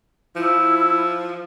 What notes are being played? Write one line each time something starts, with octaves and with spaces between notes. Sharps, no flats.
F3 E4